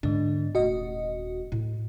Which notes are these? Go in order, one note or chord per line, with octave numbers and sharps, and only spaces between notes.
G#2 D3 B3 D4
D#1 A3 F#4 D#5
A2